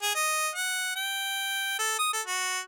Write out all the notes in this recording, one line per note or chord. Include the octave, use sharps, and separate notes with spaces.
G#4
D#5
F#5
G5
A4
D#6
A4
F#4